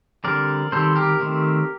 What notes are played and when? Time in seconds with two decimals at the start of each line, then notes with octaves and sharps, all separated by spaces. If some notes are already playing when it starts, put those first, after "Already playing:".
0.24 D3 G3 C4 A#4 D5
0.72 D#3 G3 C4 A4 C5
0.96 G4 A#4
1.20 D#3 A3 C4